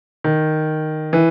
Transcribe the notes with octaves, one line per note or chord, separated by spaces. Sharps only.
D#3
E3